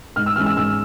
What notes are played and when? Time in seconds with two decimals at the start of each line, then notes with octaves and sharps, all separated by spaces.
0.16 G#2 F6
0.26 E6
0.36 E3 G#3 C#4 F6
0.46 E6
0.57 G#2 E6